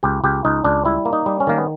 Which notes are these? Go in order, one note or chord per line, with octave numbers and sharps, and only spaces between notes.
C#2 G4
C#2 G4
C#2 D#4
C#2 D4
G3 E4
A#3
D#4
G3
C#4
D#3 A#3
B3